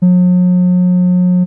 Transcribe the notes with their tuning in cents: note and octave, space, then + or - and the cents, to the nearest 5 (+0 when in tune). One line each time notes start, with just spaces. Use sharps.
F#3 -45